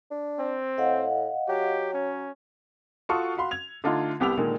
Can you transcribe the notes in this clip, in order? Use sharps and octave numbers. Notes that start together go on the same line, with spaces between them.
D4
C4
A2 D#5 F5 F#5
F#3 G4
C#4
F4 F#4 A4 A5 C#6 D#6
F#4 F5 B5 C6
G#6 F7
D3 A3 D4 D#4 F4
C2 B3 G4 D6 E6 F7
A#2 D3 D#3 G#3